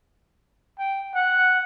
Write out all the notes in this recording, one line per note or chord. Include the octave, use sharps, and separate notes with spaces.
G5
F#5